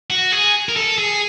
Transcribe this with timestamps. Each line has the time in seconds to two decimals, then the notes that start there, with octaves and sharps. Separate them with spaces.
0.10 F#4
0.32 G#4
0.69 A#4
0.76 A4
0.98 G#4